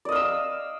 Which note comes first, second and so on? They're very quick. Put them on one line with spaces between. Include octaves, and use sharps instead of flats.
D5 D#5 F5 E6